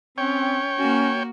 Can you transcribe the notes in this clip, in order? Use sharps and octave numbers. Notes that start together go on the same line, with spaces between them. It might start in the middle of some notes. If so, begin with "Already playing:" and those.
C4 C#4 C#5 G5
A#3 C#4 F#4